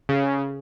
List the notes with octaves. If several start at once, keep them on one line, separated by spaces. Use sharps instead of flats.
C#3